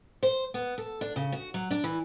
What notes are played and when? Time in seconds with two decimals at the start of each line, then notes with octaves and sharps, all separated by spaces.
0.23 C5
0.54 B3
0.78 A4
1.01 D4
1.16 C#3
1.32 F#4
1.54 F#3
1.71 D4
1.84 E3